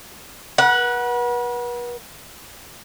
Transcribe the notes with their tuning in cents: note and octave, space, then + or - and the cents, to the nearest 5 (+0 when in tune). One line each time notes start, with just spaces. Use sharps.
B4 -40 F#5 +0